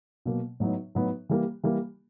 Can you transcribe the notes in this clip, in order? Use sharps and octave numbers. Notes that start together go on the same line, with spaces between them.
B2 F#3 A#3
A2 F#3 B3 D#4
A2 F#3 B3 D#4
E3 G3 A#3
E3 G3 A#3